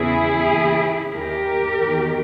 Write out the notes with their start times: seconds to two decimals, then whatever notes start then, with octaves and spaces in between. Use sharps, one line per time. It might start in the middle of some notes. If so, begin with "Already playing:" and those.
Already playing: E2 C#3 E3 E4 G#4
0.48 D#2 C#3 E3
1.14 D#2 D#3 G4 A#4
1.80 E2 D#3